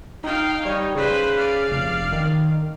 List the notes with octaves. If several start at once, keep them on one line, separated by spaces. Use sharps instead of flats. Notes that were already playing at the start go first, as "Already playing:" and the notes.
D#4 F5 G5
G3 D#4 C#5
C#3 B4 C5
D5 F5
F1
D#3